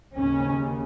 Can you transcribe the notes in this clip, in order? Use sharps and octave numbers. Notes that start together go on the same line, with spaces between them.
D#2 C#3 C#4